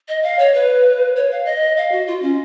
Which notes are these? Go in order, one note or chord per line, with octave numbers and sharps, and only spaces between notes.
D#5
F5
C#5
B4
C#5
F5
D#5
F5
F#4
F4
C#4